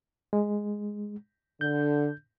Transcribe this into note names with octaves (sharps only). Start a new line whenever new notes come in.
G#3
D3 G6